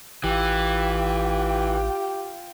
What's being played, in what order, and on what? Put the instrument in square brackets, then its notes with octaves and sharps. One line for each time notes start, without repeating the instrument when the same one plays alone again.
[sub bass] A1 [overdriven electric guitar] E3 [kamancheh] F4 G5 [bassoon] G4